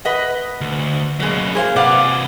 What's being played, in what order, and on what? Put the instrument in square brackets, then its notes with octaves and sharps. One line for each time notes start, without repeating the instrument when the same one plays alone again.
[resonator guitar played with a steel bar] B4 D#5 F#5
[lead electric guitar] D2
[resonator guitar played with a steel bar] B2 G#3 [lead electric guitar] F#3 A#3
[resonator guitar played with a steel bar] G#4 C5 F5
[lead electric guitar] C3 B4 [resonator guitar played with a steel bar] D5 F5 F#5